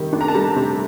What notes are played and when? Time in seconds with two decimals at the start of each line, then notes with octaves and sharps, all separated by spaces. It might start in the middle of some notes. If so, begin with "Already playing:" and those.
Already playing: C3 D#3 G3
0.13 D4
0.21 A#5
0.28 A5
0.35 G3 A#5
0.56 C3